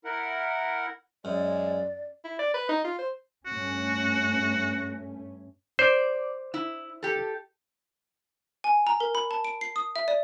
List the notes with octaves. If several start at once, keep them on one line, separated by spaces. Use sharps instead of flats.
E4 A#4 F#5
F#2 G#3 D5
E4
D5
B4
D#4
F4
C5
G2 A3 C#4 F#4
C5 D5
E4
G4 A4
G#5
A#5
A#4
B5
A5
D7
C7
D#6
E5
D5